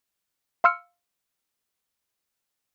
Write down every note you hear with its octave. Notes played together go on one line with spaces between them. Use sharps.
F5 C6 E6 F6 C#7